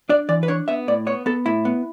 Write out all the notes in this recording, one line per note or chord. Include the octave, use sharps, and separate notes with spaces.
D4 D5
E3 D5
B4
D4 C#5
B3 E5
A2 D5
B3 C#5
B3 A4
A2 E4
B3